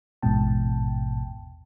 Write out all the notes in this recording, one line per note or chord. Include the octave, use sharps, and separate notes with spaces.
A1 E2 G#2 B2 G5 A5